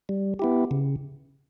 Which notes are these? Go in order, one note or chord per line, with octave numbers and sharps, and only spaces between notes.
G3
B3 E4 G4
C#3